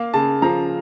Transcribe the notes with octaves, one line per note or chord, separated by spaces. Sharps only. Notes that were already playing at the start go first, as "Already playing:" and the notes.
Already playing: A#3 F5
C#3 A5
F3 A#5